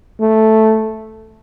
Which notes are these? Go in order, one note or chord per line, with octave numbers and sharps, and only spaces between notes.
A3